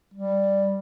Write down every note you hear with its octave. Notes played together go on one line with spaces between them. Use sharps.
G3